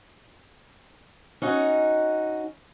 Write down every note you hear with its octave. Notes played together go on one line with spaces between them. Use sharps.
C#4 D#4 F#4